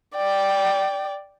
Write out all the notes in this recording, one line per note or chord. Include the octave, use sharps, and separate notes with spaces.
D5 G5